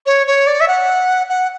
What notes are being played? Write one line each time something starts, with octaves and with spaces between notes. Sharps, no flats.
C#5
C#5
D5
E5
F#5
F#5